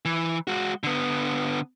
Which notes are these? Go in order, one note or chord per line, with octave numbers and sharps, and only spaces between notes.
E3
G#3 F#4
D3 B3